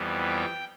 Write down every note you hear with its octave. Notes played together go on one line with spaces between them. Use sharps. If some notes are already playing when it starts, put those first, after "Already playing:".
Already playing: F2 E3 G3 B3
G5